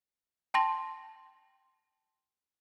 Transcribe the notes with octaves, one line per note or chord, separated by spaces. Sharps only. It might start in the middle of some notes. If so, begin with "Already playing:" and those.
G5 A5 C6 A#6